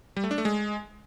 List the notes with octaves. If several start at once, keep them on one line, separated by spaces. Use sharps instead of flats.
G3
A3
D4
A3
G#3